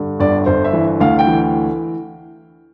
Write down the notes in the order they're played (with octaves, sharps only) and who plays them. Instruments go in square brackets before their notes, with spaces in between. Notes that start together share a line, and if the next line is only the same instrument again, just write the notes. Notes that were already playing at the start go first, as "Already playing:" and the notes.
Already playing: [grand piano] G2 D3
G1 D5
D5
G1 C5
E5
E3
D2 F5
G5
E3